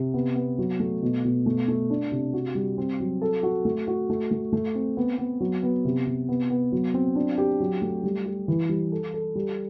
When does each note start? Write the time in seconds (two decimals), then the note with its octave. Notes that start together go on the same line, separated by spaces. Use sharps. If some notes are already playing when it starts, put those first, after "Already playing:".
Already playing: C3
0.14 B3
0.36 B3
0.58 F#3
0.80 A3
1.03 B2
1.25 B2
1.46 A3
1.68 A3
1.90 D4
2.12 C3
2.33 F#4
2.55 G3
2.78 C4
3.00 F#3
3.22 A4
3.43 F#4
3.65 A3
3.88 F#4
4.10 A3
4.31 A3
4.53 A3
4.75 C4
4.97 B3
5.18 B3
5.40 F#3
5.63 B3
5.85 C3
6.07 C3
6.29 B3
6.50 B3
6.72 F#3
6.94 C4
7.15 D4
7.38 G4
7.60 F#3
7.82 A3
8.04 G3
8.26 G4
8.48 E3
8.69 G3
8.92 A4
9.14 A4
9.35 G3